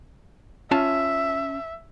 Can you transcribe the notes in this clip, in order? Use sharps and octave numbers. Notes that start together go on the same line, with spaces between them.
C#4 F4 E5 A5